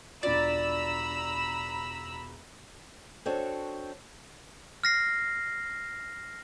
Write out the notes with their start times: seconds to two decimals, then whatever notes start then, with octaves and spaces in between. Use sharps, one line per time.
0.23 E1 D4 F4 D5 A#5 B5 E6
3.26 C4 D4 F#4 A4 C#5
4.84 F6 A#6 C7